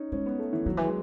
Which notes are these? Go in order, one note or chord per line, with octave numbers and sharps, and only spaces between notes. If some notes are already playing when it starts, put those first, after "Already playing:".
Already playing: C#4 D#4
G#3 C#4
B3
A3
E3
D#3 F#3
E3
G#3